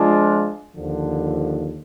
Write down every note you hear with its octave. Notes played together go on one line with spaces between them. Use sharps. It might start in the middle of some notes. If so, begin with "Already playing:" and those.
Already playing: F3 G#3 D4 F4
D#2 D3 F3